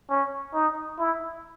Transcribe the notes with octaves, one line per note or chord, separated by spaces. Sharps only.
C#4
D#4
E4